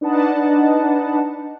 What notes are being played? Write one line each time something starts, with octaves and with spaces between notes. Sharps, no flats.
D4 D#4 B4 D#5 F#5 A5